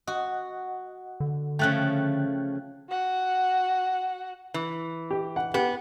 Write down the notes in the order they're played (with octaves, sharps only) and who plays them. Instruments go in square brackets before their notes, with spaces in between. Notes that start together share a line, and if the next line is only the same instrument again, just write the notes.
[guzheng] F#4 [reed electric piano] D#5 F#5
[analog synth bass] D3
[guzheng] C#3 F3 A3 [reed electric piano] G5 F#6
[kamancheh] F#4 F#5
[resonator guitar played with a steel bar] E3
[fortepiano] G4
F#5
[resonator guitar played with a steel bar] B3 [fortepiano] G4